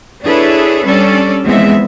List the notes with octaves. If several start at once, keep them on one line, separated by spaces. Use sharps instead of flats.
D4 E4 G#4 A4 B4 C#5
G3 C#4 D4 A4 D5
E2 F3 G#3 B3 C4 E5